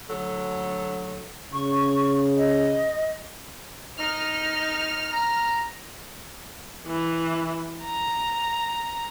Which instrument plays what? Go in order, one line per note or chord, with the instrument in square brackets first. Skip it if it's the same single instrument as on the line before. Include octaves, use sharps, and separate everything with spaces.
[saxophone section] D2 F#3 A4
[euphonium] C#3 [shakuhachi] C#6
[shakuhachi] D#5
[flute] D#4 [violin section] F6
[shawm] A#5
[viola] E3
A#5